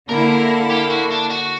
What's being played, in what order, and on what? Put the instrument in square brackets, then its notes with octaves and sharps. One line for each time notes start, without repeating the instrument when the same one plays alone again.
[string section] D3 A#3 E4 [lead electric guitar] A#4
[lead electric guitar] G4
F#4
D4
F#4